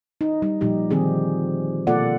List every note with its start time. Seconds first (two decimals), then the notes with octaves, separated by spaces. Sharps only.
0.21 D#4
0.42 G3 D#4
0.61 A#2 F3 G3 D#4 G4
0.91 D3 D#3 F3 C4 G4 G#4
1.87 B2 A#3 F4 A4 D5 F#5